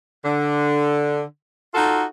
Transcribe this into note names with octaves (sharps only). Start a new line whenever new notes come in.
D3
D#4 F4 F#4 A4